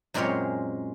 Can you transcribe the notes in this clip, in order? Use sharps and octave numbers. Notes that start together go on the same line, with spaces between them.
F#2 A#2 G#3 C4 A#4 C#5